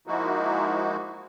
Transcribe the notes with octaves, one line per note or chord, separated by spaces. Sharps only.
F3 G#3 A#3 D#4 E4 F#4